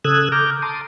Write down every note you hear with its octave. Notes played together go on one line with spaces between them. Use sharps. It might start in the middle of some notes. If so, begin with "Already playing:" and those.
C#3 A4 D#6 E6 F#6 G#6
A#5 D6 F6 G6
A5 A#5 C6 D6 D#6